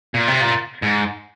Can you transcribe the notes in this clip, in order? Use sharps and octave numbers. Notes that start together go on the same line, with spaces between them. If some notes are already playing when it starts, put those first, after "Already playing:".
A#2
C3
A#2
G#2